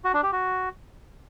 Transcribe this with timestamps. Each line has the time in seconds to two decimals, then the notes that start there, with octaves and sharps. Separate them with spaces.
0.04 F#4
0.14 D4
0.23 G4
0.32 F#4